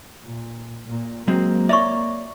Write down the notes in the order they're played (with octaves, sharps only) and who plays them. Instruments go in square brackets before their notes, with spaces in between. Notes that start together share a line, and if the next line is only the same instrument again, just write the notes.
[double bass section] A#2
A#2
[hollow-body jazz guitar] F#3 G#3 C4 [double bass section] A#3
[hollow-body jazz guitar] C#5 D5 [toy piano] E5 C#6